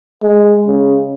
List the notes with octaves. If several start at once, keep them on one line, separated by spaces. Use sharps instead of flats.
G#3
C#3